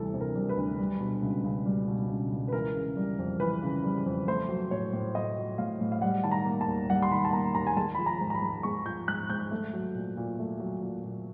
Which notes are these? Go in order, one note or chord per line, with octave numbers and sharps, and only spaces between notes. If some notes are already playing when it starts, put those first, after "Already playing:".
Already playing: D2 C3 E3 G3 A4
C3
A#4
G3
B4
D2
G3
B2
C#2
C#2
G3
B2
C#2
C#2
B4
E3 A#4
C#3
G3
F2
E3 B4
C#3
G3
F2
A3 C5
F#3
A2 C#5
A2
A3 D#5
F#3
A2 F5
A2
F5
G3 F#5
D#3 A5
A#5
A#3
A5
D#2
G3 F#5
C6
D#3 B5
A5
A#3 A#5
D#2 A#5
G#5
G#3 A5
F3 B5
A#5
G#2
A#5
B5
G#2
G#3 C#6
F3 G6
G#2 F#6
G#2 G6
A3
F#3
A#2
A#2
A3
F#3
A#2
A#2